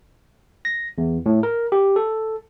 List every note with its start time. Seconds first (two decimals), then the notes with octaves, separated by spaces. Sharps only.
0.65 A#6
0.98 E2
1.26 A2
1.43 A#4
1.72 G4
1.96 A4